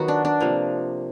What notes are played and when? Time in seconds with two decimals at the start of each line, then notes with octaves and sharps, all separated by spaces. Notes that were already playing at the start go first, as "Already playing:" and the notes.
Already playing: D#3 F#3 B3 F#4
0.08 D4
0.25 D4
0.40 C3 F3 A#3